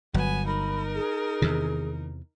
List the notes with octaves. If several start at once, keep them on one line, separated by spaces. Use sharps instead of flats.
G1 F#3 B3 G#5
D#4 A#4 B5
G#4
E2 C3 D#3 E3